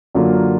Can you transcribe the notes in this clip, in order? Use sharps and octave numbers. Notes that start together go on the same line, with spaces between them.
F#2 D3 F#3 A#3 F4